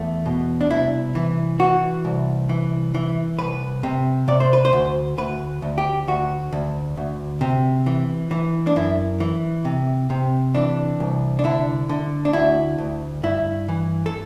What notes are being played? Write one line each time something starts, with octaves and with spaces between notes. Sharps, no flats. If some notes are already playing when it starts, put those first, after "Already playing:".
Already playing: E2 A3
B2
D4
C2 E4
E3
E3 F#4
C2
E3
E3
C2 B4
C3
C3 D5
C5
B4
C5
D2
D2 B4
D2
G4
D2 F#4
D2
D2
C3
E3
E3
D4
F#2 E4
E3
C3
C3
E3 D4
C2
D4
D3 E4
D3
D4
D2 E4
D2
G2 E4
E3
A4